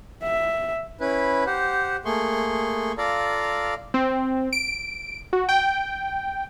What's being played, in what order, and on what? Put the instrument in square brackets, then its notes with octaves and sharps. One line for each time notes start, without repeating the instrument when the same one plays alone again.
[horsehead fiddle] E5
[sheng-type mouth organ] C#4 E4 B4
G4 C5 F#5
A3 A#3 G#4 C6 C#6
F4 A4 D5 F5 A#5
[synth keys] C4
D7
F#4
G5